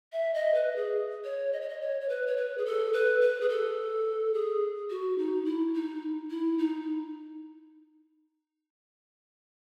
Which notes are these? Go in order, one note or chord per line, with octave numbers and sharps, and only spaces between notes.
E5
D#5
B4
G#4
C#5
D#5
C#5
D#5
C#5
C#5
B4
C#5
B4
G#4
A4
B4
B4
G#4
A4
G#4
F#4
D#4
E4
D#4
E4
D#4